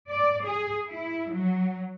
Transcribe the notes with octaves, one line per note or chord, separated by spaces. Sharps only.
D5
G#4
E4
F#3